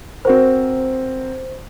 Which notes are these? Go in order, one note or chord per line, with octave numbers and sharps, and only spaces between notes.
C4 F#4 A#4 C5